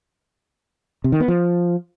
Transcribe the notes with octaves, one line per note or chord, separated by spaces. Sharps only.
C3
D#3
B3
F3